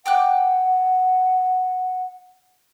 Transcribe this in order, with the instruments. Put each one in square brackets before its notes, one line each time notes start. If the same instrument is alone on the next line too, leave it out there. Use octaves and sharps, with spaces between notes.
[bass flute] F#5 [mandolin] G5 D6 F#6